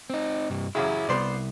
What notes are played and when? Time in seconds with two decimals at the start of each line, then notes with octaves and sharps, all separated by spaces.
0.10 C4 D#4
0.50 G2 C3
0.75 A1 F#2 C#3 E4
1.09 C2 B3 C5 D5